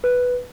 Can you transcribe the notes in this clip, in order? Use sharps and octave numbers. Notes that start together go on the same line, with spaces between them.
B4